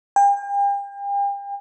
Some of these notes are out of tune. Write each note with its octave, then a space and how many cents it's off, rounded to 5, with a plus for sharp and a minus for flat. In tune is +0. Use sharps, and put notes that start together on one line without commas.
G5 +40